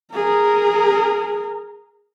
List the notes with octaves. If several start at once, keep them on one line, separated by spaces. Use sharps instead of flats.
G#4 A#4